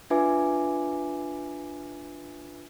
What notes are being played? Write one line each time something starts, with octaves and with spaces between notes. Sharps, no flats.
D4 F4 B4 E5 G#5 D6